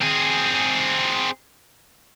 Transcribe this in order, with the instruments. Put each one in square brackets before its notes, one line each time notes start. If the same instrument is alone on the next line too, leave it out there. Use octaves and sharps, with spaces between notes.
[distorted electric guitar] C4 G#4